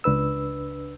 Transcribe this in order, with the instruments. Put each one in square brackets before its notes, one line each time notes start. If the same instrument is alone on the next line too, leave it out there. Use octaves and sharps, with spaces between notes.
[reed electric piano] C#2 D4 B4 E6